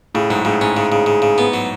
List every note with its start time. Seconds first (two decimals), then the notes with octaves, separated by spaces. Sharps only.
0.15 A2 C#3
0.30 G#2 F#3
0.45 A2 C#3
0.61 G#2 C#4
0.77 C#3
0.92 C#3
1.06 C#3
1.22 C#3
1.38 B3
1.54 F#3